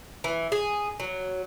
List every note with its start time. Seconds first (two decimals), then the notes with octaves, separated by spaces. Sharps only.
0.24 E3
0.52 G#4
1.00 F#3